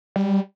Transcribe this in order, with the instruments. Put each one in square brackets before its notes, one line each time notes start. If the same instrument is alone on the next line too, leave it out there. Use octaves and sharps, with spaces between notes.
[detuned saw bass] G3